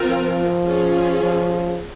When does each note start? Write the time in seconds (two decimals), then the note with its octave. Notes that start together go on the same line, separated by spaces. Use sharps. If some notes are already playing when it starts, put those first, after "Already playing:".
Already playing: C4 F4 A#4
0.09 F3
0.66 C#4 F4 G#4
1.23 F3